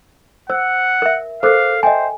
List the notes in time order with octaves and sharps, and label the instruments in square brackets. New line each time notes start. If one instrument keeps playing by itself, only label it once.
[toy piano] C5 [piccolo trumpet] F#5 [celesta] E6
[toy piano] A#4 E5
[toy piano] A4 A#4 [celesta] C5 D6 F#6 [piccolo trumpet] F5
[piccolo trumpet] C5 [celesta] D#5 E5 G5 [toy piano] G#5